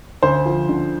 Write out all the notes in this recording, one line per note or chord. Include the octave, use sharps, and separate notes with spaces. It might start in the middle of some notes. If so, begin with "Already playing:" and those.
D2 C5
F3
D3